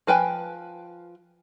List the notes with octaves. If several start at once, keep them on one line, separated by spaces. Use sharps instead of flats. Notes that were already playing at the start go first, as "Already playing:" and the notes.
F3 B4 G5 G#5